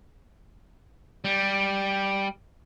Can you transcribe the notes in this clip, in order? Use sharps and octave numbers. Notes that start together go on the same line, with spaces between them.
G3